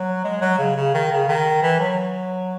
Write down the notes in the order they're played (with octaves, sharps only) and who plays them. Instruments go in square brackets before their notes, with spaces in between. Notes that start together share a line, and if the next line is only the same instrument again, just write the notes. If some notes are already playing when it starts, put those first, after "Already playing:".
Already playing: [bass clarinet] F#3
G#3
F#3
C#3
C#3
D#3
C#3
D#3
E3
F#3